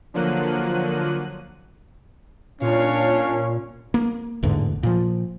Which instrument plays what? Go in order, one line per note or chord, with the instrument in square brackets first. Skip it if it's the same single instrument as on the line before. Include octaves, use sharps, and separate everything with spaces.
[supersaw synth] D3 F3 F#3 A#3 F#6 D#7
[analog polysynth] A#2 [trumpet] C#4 [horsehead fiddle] D4 F5 [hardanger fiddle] C#5
[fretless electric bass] A#3
A1 E2 G#2 D3
A#2 F3